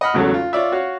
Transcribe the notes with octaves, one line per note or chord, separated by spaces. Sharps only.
D#5 F#5 B5 F6
G#1 E2 C#3 F#3 A3 A4
F4
F4 C#5 D5 E5
F#4 C#5 F5